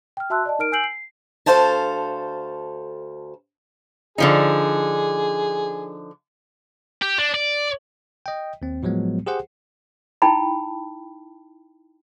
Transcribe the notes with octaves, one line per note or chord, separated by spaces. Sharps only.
G5 F6
F#4 E5 A5 C6 E6 F#6
D5 D#5 A5
D#4 A#4 F6 D7
G#5 E6 G6 C7 D7 F#7
C7
D2 G2 A4 C5 F5 A5
D3 F3 D#4 G#4
G4
D4
D5
D#5 G5
D#2 C4
A2 F3 F#3 G#3 B3
G4 G#4 C5 F#5
D#4 E4 G5 A5 B5